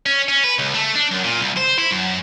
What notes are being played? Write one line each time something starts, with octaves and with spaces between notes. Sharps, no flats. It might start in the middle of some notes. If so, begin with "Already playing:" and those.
C#4
C#4
B4
C#2
A3
D4
F#2
A#2
C2
C5
E4
F#2